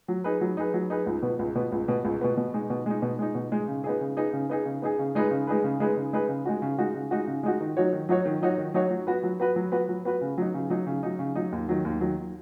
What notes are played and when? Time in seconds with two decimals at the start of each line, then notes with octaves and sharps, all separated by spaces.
0.08 F#3
0.24 D#4 G#4 B4
0.41 F#3
0.57 D#4 G#4 B4
0.74 F#3
0.90 D#4 G#4 B4
1.06 C#2
1.22 B2 B3
1.39 C#2
1.55 B2 B3
1.72 C#2
1.88 B2 B3
2.04 C#2
2.21 B2 B3
2.37 B2
2.54 G#3 D#4
2.70 B2
2.86 G#3 D#4
3.02 B2
3.19 G#3 D#4
3.35 B2
3.52 G#3 D#4
3.68 C#3
3.84 B3 D#4 G#4
4.01 C#3
4.17 B3 D#4 G#4
4.33 C#3
4.49 B3 D#4 G#4
4.66 C#3
4.82 B3 D#4 G#4
4.99 C#3
5.15 G#3 D#4 G#4 B4
5.31 C#3
5.47 G#3 D#4 G#4 B4
5.64 C#3
5.80 G#3 D#4 G#4 B4
5.97 C#3
6.13 G#3 D#4 G#4 B4
6.29 C#3
6.45 G#3 D#4 F#4
6.62 C#3
6.78 G#3 D#4 F#4
6.94 C#3
7.11 G#3 D#4 F#4
7.27 C#3
7.43 G#3 D#4 F#4
7.60 D#3
7.77 F#3 D#4 F#4 C#5
7.93 D#3
8.09 F#3 D#4 F#4 C#5
8.25 D#3
8.42 F#3 D#4 F#4 C#5
8.58 D#3
8.74 F#3 D#4 F#4 C#5
8.90 F#3
9.07 B3 F#4 B4
9.23 F#3
9.40 B3 F#4 B4
9.56 F#3
9.72 B3 F#4 B4
9.89 F#3
10.05 B3 F#4 B4
10.21 C#3
10.38 F#3 D#4
10.54 C#3
10.70 F#3 D#4
10.87 C#3
11.03 F#3 D#4
11.19 C#3
11.35 F#3 D#4
11.52 D#2
11.69 D#3 F#3
11.85 D#2
12.01 D#3 F#3